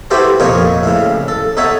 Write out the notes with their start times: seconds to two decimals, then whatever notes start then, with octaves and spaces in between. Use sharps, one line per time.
0.11 E4 F#4 G4 A4 B4 C5
0.40 F2 A#2 D#4 A#4 C#5 C#6
0.83 A2 C#3
1.28 A4
1.57 D#4 A4 C#5 E5 F#5